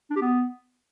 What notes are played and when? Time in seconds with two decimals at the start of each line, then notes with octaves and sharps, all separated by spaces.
0.10 D4
0.16 G4
0.22 B3